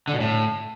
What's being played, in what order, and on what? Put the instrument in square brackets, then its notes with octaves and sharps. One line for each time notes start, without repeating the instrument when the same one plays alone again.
[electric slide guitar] D3
B2
A2